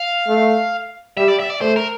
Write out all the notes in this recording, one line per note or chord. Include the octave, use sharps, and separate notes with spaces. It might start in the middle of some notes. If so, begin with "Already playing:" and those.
Already playing: F5
A3
G3 E5
D5
E5
D5
A3 C5
A#4